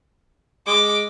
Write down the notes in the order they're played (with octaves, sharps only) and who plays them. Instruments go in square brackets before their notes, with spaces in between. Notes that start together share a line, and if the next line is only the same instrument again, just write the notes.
[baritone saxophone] G#3 [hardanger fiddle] D6